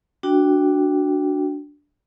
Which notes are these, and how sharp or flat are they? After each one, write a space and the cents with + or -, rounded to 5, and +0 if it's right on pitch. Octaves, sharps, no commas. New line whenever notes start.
D4 +0 F#4 +0 G5 +0